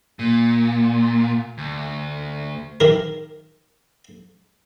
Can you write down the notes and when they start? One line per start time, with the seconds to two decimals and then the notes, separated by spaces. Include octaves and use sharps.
0.19 A#2
1.58 D2
2.80 D#3 A#4